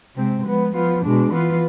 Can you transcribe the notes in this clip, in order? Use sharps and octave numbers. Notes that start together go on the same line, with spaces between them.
C3 G#3 C4
F3 G#3 B3
F3 B3 F4
B2 G#3 D4
E3 B3 F4 B4